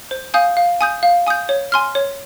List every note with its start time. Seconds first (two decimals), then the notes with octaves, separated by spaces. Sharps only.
0.11 C5
0.34 F5 G#5 D#6 G6
0.57 F5
0.81 G#5 D#6 G6
1.03 F5
1.27 G#5 D#6 G6
1.49 C#5
1.72 G#5 C6 F6
1.95 C#5